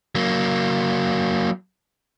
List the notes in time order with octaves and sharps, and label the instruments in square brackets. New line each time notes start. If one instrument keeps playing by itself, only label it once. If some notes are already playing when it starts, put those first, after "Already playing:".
[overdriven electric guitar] F#3 A#3